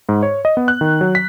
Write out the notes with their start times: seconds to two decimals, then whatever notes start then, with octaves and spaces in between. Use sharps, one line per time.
0.09 G#2
0.23 C#5
0.45 D#5
0.57 B3
0.68 F#6
0.81 D#3
1.01 F#3
1.15 B6